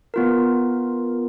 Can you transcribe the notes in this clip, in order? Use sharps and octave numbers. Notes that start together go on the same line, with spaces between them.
B3 F4 A#4